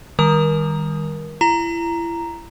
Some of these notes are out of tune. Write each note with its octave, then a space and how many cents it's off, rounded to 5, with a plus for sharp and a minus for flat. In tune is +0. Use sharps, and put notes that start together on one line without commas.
D#3 +0 G3 +35 A#4 +25
E4 +35 A#5 +0